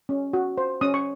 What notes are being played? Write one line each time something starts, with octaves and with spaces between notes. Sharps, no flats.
C#4
F#4
C5
C#4 D#6
C#6